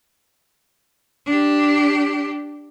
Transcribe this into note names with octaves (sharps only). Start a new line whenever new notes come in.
D4 G4